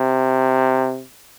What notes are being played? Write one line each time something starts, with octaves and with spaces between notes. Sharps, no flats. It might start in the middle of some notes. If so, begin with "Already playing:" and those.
Already playing: C3